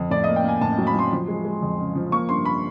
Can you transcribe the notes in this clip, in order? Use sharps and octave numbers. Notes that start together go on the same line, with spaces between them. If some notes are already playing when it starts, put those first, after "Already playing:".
Already playing: F2
A2 D5
A#3 D#5
G5
A#3 G#5
A2 A5
F#3
B5
F#3 C6
F3
G#3
G#3
F2
C#3
F3
A#3 C#6
G2 C6
A#3 B5